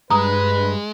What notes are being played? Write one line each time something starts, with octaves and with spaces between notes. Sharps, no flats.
G2 G#3 B4 A#5 D#6